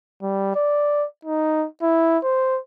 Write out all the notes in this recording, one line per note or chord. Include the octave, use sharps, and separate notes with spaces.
G3
D5
D#4
E4
C5